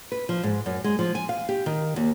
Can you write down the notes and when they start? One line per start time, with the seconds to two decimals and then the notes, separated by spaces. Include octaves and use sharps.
0.12 B4
0.29 F3
0.43 G#2
0.66 F#2
0.84 G#3
0.99 F3
1.15 G#5
1.29 F5
1.49 G4
1.66 D#3
1.96 D#2